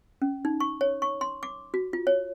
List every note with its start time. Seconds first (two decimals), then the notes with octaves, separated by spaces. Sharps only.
0.22 C#4
0.45 D#4
0.60 C#6
0.81 C#5
1.02 C#6
1.21 C6
1.43 D6
1.74 F#4
1.93 F4
2.07 C#5